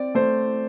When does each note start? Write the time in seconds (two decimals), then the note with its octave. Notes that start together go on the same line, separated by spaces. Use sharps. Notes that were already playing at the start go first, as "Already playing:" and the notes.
Already playing: C4 D5
0.15 A3 C5